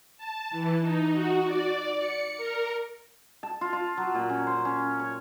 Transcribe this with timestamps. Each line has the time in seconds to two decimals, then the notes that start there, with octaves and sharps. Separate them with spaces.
0.17 A5
0.51 E3
0.81 D#4
1.12 F#4
1.45 D5
1.98 C#7
2.37 A#4
3.43 A5
3.61 F4
3.73 F4
3.97 F#3
4.15 A#2
4.29 C#4
4.47 C5
4.65 C#4
5.00 C#5